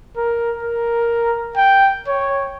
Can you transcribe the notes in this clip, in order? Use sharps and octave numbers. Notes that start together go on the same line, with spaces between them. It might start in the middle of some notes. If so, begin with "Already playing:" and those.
A#4
A#4
G5
C#5